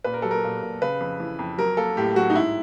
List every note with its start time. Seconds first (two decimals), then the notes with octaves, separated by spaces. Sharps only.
0.04 A#2 B4
0.14 A#4
0.22 F#3 A4
0.31 A#4
0.44 A#2
0.62 A#2
0.82 C#3 B4
1.00 F2
1.20 E3
1.39 F2
1.58 F#3 A#4
1.77 A#3 A4
1.97 A2 G4
2.16 F#3 F#4
2.30 D#4
2.35 G#2 E4